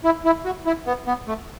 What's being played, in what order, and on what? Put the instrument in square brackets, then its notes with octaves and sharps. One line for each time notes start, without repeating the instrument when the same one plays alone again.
[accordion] E4
E4
F#4
E4
B3
B3
A3